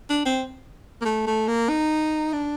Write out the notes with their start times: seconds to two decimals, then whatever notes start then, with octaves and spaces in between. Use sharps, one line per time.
0.10 D4
0.25 C4
1.01 A#3
1.05 A3
1.27 A3
1.47 A#3
1.69 D#4
2.33 D4